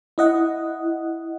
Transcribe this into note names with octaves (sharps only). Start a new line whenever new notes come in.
E4 D#5 F#5